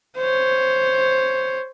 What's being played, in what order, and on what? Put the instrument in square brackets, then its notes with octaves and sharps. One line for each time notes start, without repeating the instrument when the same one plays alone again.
[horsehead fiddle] C5 C#5